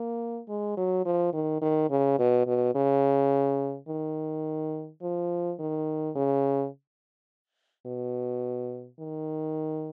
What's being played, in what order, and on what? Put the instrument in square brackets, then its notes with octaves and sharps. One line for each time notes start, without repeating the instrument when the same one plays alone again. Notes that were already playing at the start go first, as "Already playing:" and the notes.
Already playing: [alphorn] A#3
G#3
F#3
F3
D#3
D#3
C#3
B2
B2
C#3
D#3
F3
D#3
C#3
B2
D#3